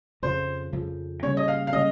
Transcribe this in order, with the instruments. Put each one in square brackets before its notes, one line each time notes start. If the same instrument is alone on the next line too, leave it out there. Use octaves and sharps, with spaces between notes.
[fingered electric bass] F2 C#3 F3 [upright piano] C5
[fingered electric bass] F2 C#3 F3
[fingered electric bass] C#3 G3 A#3 C#4 [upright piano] C#5
[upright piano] D#5
F5
F5
[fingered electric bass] C#3 G3 A#3 C#4 [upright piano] D#5